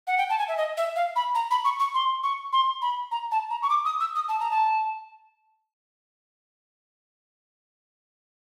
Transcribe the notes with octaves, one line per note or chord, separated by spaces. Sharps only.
F#5
G5
A5
G#5
E5
D#5
E5
F5
B5
A#5
B5
C#6
C#6
C6
C#6
C6
B5
A#5
A5
A#5
C#6
D6
D#6
E6
D#6
A5
A#5
A5